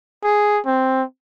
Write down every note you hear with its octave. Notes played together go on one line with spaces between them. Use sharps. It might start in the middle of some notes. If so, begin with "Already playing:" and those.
G#4
C4